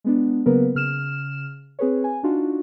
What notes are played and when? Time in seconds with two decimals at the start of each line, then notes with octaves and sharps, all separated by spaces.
0.04 G#3 B3 D4
0.46 C#3 F#3 A#3 B3 A#4 B4
0.75 C#3 F6 E7
1.79 C4 G#4 B4 C#5
2.04 G#5
2.23 D4 D#4 F4 F#4